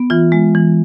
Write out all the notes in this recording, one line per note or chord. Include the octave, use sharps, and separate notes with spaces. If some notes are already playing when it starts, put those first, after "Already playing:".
Already playing: B3
E3 F4
G#3
E3